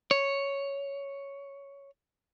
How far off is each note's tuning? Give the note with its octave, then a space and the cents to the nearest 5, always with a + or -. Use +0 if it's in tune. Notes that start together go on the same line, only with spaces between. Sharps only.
C#5 +5